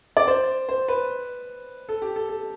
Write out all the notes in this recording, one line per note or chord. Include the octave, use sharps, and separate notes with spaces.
D5
C5
C5
B4
A4
G4
A4
A4